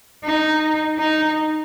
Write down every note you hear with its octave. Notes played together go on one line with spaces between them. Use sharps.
D#4
D#4